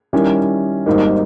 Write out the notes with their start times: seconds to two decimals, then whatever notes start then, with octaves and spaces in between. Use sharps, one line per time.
0.13 D#3 G3 C#4 E4 A#4
0.86 G#1 G#2 G3 A#3 D#4